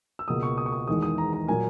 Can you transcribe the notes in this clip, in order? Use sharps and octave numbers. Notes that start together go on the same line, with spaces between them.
E6
C#2 B2 A#3 D#6
C#6
D#6
C#6
D#6
E2 D#3 G#3 D#6
D#6
A#5
A#5
A#2 F#3 A#3 G#5